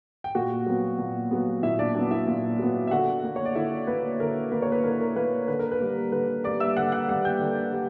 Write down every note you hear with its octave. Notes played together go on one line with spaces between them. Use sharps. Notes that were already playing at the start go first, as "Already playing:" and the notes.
G5
A#2 F#4 F#5
F#3 B3
A#2
F#3 B3
A#2 E4 E5
D4 D5
F#3 B3 D4 D5
E4 E5
A#2
F#3 B3
E5
D3 F#4 F#5
A#3
C#5
D5
D3 E4 E5
A#3 B4
D3 A#4
A#3 B4
C#5
B4
D3 A#4
A#4
A#3 B4
D3 B4
A#4
B4
G3 A#3
D3 B4
G3 A#3 D5 D6
E5 E6
D3 F#5 F#6
F#5 F#6
G3 A#3 F#5 F#6
G5 G6
D3
G3